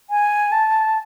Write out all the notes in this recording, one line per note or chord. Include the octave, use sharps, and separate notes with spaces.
G#5
A5